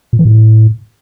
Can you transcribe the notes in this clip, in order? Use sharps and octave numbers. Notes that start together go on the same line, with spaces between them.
A#2
E3
A2